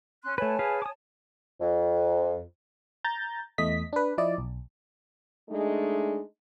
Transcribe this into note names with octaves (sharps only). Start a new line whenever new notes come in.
C#4 C6 F#6
A3 B4 C#5 G#5 A5
G#4 B4 F5
D6 D#6
F2
A#5 G6 A6
E2 A3 D#5 B6
D4 B4
F3 E4 D5 D#5
B1
G#3 A3 D4 D#4 G#4